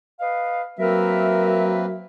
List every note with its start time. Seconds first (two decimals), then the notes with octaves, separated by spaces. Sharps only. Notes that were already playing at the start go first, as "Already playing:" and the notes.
0.20 B4 D#5 F5
0.79 F#3 A#3 C4 A#4 B4 E5